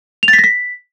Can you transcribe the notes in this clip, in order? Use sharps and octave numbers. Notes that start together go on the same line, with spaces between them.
F7
A6
B6
A#6
B6